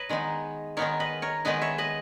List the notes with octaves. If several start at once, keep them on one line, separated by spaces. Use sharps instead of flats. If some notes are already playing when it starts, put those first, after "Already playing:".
Already playing: B4 C#5 D#5
D#3 G#3 B3 D#4
D#3 G#3 B3 D#4 A#4 C#5
B4 D#5
A#4 C#5
D#3 G#3 B3 D#4 B4 D#5
C#5 E5
B4 D#5